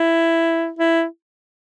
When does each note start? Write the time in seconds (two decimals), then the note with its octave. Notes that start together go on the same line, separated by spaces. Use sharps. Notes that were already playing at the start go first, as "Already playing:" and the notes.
Already playing: E4
0.79 E4